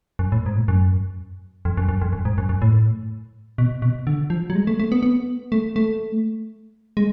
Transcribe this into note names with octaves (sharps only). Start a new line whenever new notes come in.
F#2
A2
G#2
A2
F#2
F2
F#2
F#2
F2
F#2
G#2
F#2
F#2
A2
B2
B2
D3
F3
F#3
G#3
A3
A3
B3
B3
A3
A3
G#3